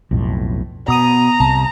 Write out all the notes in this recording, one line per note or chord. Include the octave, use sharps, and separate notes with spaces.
B1 F2 A2
B2 B3 A#5 D#6 D#7
C2 C3 A5